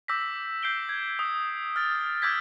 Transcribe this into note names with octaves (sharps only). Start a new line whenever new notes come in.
D6 E6 G6 A#6 B6
G6 C7 D7 G7
G#6
D#6
F6 A6
D6 E6 F6 G6 G#6 B6